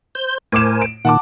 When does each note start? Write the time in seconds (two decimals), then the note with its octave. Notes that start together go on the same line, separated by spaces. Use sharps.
0.15 C5 G6
0.52 A2 A#4 C5 G#5 D6 E7
0.82 D7
1.05 A#2 D#3 F#5 A5 D6